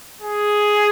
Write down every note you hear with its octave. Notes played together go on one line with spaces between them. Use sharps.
G#4